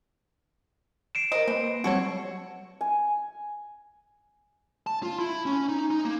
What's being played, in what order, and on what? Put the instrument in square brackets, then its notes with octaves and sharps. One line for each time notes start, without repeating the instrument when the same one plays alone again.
[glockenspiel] C7 D7 E7
[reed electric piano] A#4 C5 [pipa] D#5
[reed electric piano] A#3 B4 [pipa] C4
[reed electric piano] F#3 G3 C4 [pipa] F#4 A4 C#5
[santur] G#5
[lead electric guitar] A5
F4
E4
C#4
D#4
D#4
A#3